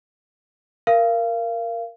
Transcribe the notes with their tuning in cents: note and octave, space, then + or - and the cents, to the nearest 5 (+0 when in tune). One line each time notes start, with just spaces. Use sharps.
A#4 +0 F5 -30